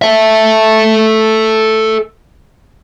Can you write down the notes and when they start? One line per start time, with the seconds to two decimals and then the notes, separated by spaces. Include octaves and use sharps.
0.02 A4 E5